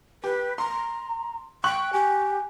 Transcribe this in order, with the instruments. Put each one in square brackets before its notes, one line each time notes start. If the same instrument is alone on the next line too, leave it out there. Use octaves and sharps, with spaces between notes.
[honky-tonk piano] G4 [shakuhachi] B4
[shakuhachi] A#5 [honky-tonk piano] C6
[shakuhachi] G5 [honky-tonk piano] C#6 F#6 F#7
[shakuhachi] G4 [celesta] G#5